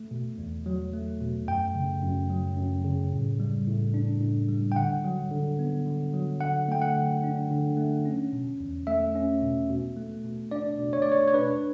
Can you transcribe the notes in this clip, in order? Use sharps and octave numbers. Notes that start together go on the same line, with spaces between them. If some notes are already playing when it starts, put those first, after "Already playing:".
Already playing: A3
B2
E2
F#3
A3
B2
F#2 G5
C#3
F#2
F#3
F#2
C#3
A2
G3
A2
D4
A2
G3
G5
D3 F#5
F#3
D3
B3
D3
F#3
D3 F#5
A3 G5
F#5
D3
D4
D3
A3
C#4
B2
E2
A3 E5
C#4
B2
B2
A3
B2
D4 D5
B2
C#5
A3 D5
C#5
C#5
D4 B4